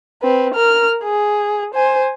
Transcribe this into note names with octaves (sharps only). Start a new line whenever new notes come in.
C4 B4
A#4 F6
G#4
C5 G#5